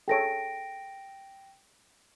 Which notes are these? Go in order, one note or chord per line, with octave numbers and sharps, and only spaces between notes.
G#4 A4 C#5 G5 A#6 D7